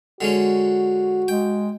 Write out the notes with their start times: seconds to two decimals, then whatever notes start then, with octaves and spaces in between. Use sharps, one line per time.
0.21 D3 G#3 C#4 F#4
1.28 G#3 G5